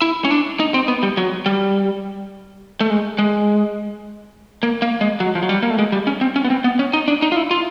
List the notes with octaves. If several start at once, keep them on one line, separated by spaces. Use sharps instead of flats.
E4
C#4
D4
D#4
C4
B3
G3
F#3
G3
A3
G#3
G#3
A#3
A#3
G#3
F#3
F3
F#3
G3
A#3
A3
G#3
G3
C#4
C4
C#4
B3
C4
B3
C#4
D#4
D4
D#4
F4
E4
F4